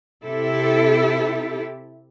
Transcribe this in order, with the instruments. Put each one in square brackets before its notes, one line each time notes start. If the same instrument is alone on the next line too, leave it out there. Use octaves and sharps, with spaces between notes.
[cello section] C3 E4 G4 A4